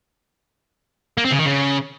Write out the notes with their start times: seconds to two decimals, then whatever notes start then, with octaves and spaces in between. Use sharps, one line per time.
1.18 A#3
1.25 C4
1.32 C#3
1.39 D#3
1.46 C#3